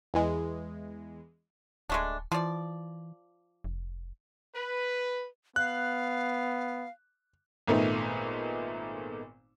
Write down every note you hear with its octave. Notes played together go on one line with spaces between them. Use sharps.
E2 E3 G#3
D1 G#3 A3 D4
E3 F3 D5
F1
B4
B3 F5 F#6
G#1 A#2 A3 B3 D#4